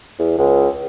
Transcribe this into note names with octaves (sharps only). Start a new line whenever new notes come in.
E2
C#2